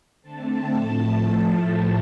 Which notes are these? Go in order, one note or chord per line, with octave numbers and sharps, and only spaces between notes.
D3 A3 C4 A5
A2 F3 A3